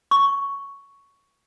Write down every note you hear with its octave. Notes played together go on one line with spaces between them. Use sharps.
C#6